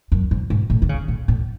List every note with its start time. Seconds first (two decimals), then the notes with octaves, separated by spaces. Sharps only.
0.12 F#2
0.31 G#2
0.50 G#2
0.70 A2
0.82 D#3
0.89 C#3
1.08 A2
1.28 A2